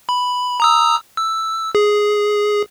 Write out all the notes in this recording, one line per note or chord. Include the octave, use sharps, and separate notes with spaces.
B5
A#5 D#6 E6
E6
G#4